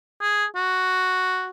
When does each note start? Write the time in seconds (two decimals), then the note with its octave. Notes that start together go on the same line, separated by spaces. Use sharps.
0.21 G#4
0.55 F#4